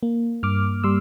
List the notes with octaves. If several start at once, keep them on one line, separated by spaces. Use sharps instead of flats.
A#3
G2 D6 F6
G3 C6 E6